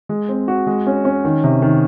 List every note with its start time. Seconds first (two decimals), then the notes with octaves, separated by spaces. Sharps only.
0.09 G#3
0.29 C4
0.48 F#4
0.67 G#3
0.87 C#4
1.05 C#4
1.25 D#3
1.44 C3
1.62 D#3